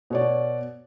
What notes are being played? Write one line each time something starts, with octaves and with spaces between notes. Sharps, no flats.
B2 C#5 D5